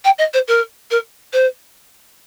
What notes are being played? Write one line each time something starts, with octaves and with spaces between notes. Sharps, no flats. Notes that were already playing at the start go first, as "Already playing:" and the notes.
G5
D#5
C5
A#4
A#4
C5